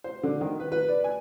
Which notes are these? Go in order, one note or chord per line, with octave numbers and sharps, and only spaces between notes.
C5
D3
D#3
B4
B4
D5
G#5